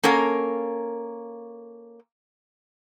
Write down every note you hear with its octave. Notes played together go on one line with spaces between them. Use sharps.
A#3 C#4 A4 A#4 F5